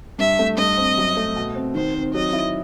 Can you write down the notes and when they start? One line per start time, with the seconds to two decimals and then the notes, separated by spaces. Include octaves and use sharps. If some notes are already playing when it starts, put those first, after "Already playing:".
0.19 G2 E5
0.39 A3
0.57 G2 D#5
0.77 C4
0.98 F#2
1.17 A3
1.36 B2
1.55 C4
1.75 D#3 C5
1.95 C4
2.14 F#3 D#5
2.33 E4